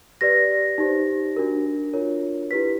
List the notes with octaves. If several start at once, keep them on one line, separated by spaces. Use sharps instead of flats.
G4 B4 D5 A#6
D#4 G4 C5
D4 F#4 A#4
D4 F4 A#4 C#5
E4 G4 B4 B6